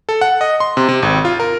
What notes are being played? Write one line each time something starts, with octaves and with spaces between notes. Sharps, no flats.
A4
F#5
D#5
C6
C3
C3
G#1
F4
A#4